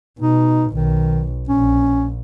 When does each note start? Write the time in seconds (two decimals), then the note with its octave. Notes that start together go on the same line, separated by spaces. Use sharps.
0.20 B2 D#4
0.72 B1 D#3
1.49 A#1 C#4